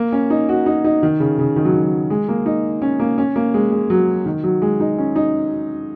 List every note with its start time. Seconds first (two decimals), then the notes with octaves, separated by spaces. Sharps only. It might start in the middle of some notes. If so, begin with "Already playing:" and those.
Already playing: A#3
0.12 C#4
0.30 D#4
0.49 F#4
0.66 D#4
0.84 D#4
1.03 D#3
1.20 C#3
1.39 C#3
1.56 D#3
1.65 F#3
1.74 D#3
1.83 F#3
2.10 G#3
2.28 A#3
2.46 D#4
2.82 C#4
3.00 A#3
3.18 C#4
3.36 A#3
3.54 G#3
3.71 G#3
3.90 F#3
4.26 D#3
4.44 F#3
4.62 G#3
4.80 D#4
4.98 C#4
5.16 D#4